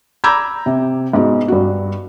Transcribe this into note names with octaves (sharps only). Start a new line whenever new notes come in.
A#5 B5 D6 E6 G6 G#6
C3
G#2 G#3 B3 F#4
G2 F#4